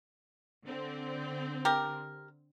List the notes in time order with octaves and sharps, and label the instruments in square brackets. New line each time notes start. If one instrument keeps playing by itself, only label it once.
[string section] D3 C4
[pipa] G4 A#4